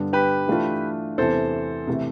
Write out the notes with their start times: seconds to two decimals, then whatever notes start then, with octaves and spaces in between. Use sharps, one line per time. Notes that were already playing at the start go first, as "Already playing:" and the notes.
Already playing: G2 D3 G3 B3 D4
0.13 G4 B4
0.47 E3 A3 D4 F4
1.18 E2 C3 E3 A4 C5
1.87 C3 E3 A3